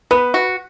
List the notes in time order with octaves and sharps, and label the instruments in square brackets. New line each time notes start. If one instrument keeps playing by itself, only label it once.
[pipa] B3 [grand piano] B4
[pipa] F#4